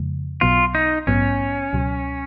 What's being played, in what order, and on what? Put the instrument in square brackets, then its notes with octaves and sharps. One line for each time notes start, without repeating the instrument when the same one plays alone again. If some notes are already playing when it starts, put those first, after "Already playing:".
Already playing: [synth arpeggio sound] F2 C#3 F3 G#3
[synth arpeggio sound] B1 B2 F#3 B3 [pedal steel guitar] F4
[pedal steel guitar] D#4
[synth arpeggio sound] A#1 G#2 F#3 B3 [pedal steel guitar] C#4
[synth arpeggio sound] C#2 B2 F#3